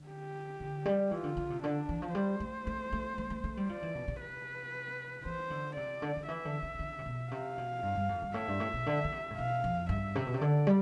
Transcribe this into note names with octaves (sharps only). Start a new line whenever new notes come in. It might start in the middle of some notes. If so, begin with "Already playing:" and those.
Already playing: D3
G4
D3
G3
E3 F4
D3
D3
C3
D3 D4
E3
F3
G3 C5
A3
A3
A3
A3
A3
A3
G3
F3 D5
E3
B2
C3
B4
E3 C5
D3
C3 D5
D3
D3
E3 E5
D3
D3
C3
D3
C3
B2
C3 F5
B2
G2
G2
F2
G2
A2 E5
G2
A2
B2
D3
D3
C3
A2
B2 F5
F2
G2 E5
C3
B2
C3
D3 D5
G3